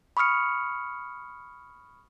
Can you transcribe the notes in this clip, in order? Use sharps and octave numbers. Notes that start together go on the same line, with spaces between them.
B5 C#6 D#6 F6 C#7